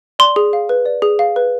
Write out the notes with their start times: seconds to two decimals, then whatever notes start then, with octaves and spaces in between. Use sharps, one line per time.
0.19 D5 C6
0.36 G#4
0.53 F5
0.69 B4
0.86 D5
1.02 G#4
1.19 F5
1.36 B4